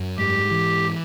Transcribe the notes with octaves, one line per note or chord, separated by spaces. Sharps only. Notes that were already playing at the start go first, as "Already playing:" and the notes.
Already playing: F#2
G#2 G4
E3